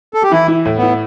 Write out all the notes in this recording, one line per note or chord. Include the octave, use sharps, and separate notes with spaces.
A4
G4
E3 E4
E4
A2
B3
E4